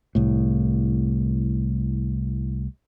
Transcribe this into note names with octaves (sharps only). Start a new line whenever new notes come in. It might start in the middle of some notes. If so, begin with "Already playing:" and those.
C2 A2